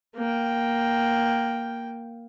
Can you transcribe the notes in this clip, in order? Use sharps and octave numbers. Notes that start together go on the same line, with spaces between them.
A#3 G5